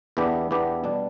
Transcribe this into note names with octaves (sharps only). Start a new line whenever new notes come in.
E2 E3 B3 D4 G4
E2 E3 B3 D4 G4
B2 G3 D4